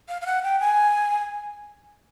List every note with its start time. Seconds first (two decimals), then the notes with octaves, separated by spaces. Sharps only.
0.09 F5
0.21 F5
0.26 F#5
0.43 G5
0.60 G#5